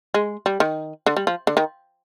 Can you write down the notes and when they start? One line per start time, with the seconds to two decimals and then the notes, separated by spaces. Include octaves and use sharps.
0.14 G#3
0.46 G3
0.60 D#3
1.06 D3
1.17 G3
1.27 F3
1.47 D3
1.57 D#3